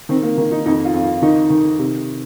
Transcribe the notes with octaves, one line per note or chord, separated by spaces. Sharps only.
D#3 C4
A#3
D#3 A#3
D#4
F2 D#4
F4
F2
F4
D#3 D#4
D#3
C3